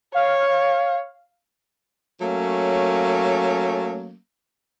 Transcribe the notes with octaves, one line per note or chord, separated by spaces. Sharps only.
C#5 F5
F#3 A3 A#3 C#4